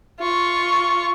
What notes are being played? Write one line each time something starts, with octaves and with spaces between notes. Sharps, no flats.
F4 C#6